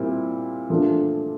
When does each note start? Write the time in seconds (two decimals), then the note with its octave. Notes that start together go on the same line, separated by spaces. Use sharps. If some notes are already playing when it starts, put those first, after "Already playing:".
Already playing: A#2 G3 C4 E4
0.70 A#2 F3 A3 D4